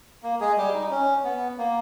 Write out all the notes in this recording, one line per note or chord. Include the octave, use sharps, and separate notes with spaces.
A#3
G#3 G#4
G3 G4
D#4
C#4
B3
A#3